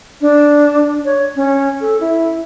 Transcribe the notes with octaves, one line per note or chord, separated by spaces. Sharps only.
D4
C#5
C#4
A4
E4